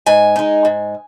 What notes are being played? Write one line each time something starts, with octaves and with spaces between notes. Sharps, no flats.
G#2 G#5
G#3 D#4
G#2